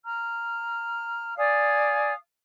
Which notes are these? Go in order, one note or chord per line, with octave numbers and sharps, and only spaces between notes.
A#5 F6
D5 F5 G#5 D#6